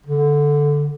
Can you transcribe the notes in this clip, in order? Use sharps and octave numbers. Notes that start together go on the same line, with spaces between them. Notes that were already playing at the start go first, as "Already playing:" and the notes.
D3